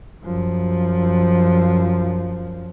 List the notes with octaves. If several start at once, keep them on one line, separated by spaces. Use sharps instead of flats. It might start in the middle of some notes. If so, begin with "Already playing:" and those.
F#2 F3